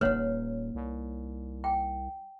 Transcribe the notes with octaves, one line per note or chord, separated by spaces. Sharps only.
D#1 A#3 D#4 B4 C#5 F#5
C2
G5 G#5